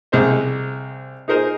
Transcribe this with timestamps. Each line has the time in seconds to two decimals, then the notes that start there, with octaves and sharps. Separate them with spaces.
0.12 C2 G#3 C5 D#5
1.28 D#4 G#4 A#4 C5 D#5